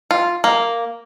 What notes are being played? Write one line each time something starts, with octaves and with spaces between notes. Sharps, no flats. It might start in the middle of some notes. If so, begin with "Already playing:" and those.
F4
A#3